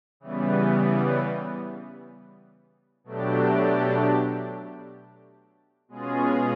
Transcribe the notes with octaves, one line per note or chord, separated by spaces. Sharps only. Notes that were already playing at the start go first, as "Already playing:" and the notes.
C#3 E3 G3 B3
B2 F#3 A3 D4 G4
B2 G#3 C#4 F4 G#4